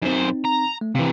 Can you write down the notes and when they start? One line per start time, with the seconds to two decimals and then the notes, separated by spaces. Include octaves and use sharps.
0.02 F#2 C4 D#4 C5
0.44 A#5
0.81 A3
0.95 C3 E3 F5